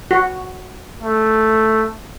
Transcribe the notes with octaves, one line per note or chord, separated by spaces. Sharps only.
F#4
A3